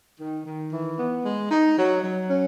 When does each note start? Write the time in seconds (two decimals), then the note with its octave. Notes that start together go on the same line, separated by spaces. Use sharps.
0.19 D#3
0.45 D#3
0.71 E3
0.97 B3
1.23 G#3
1.50 D#4
1.77 F#3
2.03 F#3
2.28 C#4